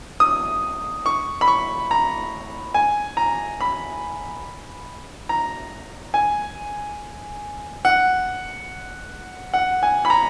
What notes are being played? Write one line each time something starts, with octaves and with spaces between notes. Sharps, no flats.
D#6
C#6
B5
C#6
A#5
G#5
A#5
B5
A#5
G#5
F#5
F#5
G#5
B5
A#5